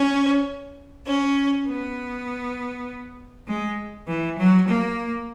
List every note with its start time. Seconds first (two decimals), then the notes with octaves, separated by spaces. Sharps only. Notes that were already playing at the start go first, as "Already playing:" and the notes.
Already playing: C#4
1.06 C#4
1.66 B3
3.47 G#3
4.07 E3
4.38 F#3
4.67 A#3